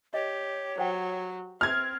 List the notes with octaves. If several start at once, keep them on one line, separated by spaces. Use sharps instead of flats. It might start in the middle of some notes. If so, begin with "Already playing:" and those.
G4 C#5 D#5
F#3 C5 F#5 G5
C4 F6 G#6